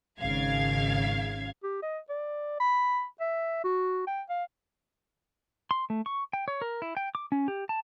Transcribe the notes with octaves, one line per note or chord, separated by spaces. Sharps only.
G#1 C#3 F5 G#6
G4
D#5
D5
B5
E5
F#4
G5
F5
C6
A3
C#6
G5
C#5
A#4
E4
G5
D6
C#4
G4
A5